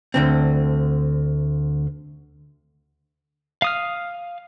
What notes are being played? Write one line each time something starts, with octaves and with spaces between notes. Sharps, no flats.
D2 D3 C4
F5 D#6 F6